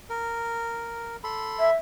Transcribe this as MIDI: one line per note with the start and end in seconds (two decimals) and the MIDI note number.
0.09 1.16 70
1.24 1.70 69
1.24 1.70 83
1.24 1.70 84
1.60 1.73 76